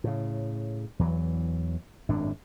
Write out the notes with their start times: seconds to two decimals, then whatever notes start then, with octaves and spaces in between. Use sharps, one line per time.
0.04 A2 C#3
0.99 E2 E3 F#3
2.09 G#1 F#2 A2 D4